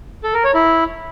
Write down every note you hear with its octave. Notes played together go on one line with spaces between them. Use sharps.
A4
A#4
C#5
E4